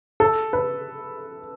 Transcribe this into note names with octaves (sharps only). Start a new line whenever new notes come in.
A4
B4